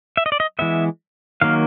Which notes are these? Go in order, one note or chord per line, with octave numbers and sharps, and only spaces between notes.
E5
D#5
D5
D#5
E3 G#3 B3 E5
D#3 F#3 A#3 F5